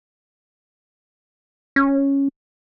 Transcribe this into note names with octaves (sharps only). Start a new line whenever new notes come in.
C#4